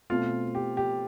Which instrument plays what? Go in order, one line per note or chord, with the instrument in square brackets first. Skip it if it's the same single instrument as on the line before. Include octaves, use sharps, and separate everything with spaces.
[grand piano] B2 A3 C4 [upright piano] F4
[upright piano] G4
G4